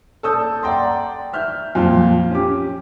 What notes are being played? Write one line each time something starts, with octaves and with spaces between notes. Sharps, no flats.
A4 D5 D#6 E6 G6
D5 F#5 G5 A#5 C6
E5 F6 G6
F2 A#2 F3 F4
C#4 G4 D6